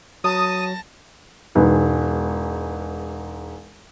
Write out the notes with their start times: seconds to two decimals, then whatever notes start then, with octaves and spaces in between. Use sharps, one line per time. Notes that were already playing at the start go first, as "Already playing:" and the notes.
0.24 F#3 A5 D#6 A#6
1.55 E1 G#2 B4